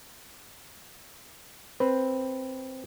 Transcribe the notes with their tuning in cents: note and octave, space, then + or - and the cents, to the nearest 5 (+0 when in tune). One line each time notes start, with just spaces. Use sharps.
C4 +0 B4 +0